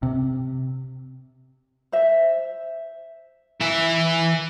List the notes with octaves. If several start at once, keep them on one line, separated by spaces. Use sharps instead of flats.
C3
C5 E5
E3 E5